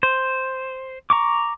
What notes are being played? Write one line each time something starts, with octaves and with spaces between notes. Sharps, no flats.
C5
A#5 C#6 D6